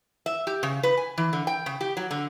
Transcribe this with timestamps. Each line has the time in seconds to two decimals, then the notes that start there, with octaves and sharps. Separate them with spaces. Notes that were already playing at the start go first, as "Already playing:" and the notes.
0.26 E5
0.47 G4
0.63 C#3
0.83 B4
0.97 G#5
1.18 E3
1.33 D3
1.47 G5
1.66 C#3
1.81 G4
1.97 F#3
2.11 D3